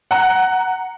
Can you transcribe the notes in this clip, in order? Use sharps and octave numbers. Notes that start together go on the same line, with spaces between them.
F#5 A#5